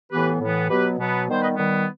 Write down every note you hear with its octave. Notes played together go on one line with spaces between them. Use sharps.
A2 E3 B3 G4 B4
A2 E3 B3
B2 F#3 B3 G4 B4
B2 F#3 B3
D#3 G3 B3 C5
B4 D#5
D#3 G3 B3